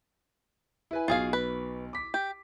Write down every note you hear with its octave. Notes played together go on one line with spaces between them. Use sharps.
E4 B4 G#5
B1 B2 F4 G#4 F5
B4
D6 B6
G4